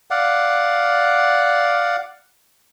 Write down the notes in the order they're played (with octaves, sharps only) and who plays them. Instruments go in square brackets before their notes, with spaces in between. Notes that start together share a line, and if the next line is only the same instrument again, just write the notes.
[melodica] D5 F5 F#5